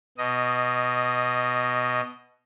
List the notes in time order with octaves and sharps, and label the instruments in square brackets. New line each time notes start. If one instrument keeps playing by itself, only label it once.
[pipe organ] B2 D#5